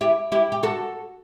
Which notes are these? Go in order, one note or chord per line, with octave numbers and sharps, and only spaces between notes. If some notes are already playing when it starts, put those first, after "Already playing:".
E4 G4
E4 G4
G4
F#4 A4